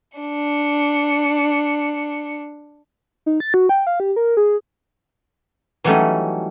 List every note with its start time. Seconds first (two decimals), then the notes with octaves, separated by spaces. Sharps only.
0.17 D4 C#7
3.26 D#4
3.40 A6
3.54 F#4
3.69 G5
3.87 F5
4.00 G4
4.16 A#4
4.37 G#4
5.84 E3 F#3 G3 A3 C#4 D#4